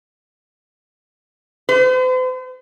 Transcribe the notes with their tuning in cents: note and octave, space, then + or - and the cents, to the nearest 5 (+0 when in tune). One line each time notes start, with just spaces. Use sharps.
C5 -45